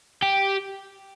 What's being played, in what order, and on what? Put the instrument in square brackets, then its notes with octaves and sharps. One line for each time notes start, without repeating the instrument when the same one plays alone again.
[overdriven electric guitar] G4